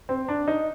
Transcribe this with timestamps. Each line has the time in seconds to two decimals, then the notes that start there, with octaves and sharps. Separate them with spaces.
0.09 C4
0.28 D4
0.48 D#4